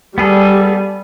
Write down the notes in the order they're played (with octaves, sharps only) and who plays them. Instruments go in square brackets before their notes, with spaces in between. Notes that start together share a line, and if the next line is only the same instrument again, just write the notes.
[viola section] G3 [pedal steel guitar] B3 G#4 A4